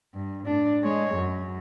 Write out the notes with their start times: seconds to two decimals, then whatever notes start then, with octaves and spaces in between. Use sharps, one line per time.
0.14 G2
0.46 A2 D4
0.83 G#3 C#5
1.14 F#2